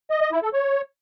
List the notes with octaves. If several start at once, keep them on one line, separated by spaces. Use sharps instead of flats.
D#5
D#5
E4
A4
C#5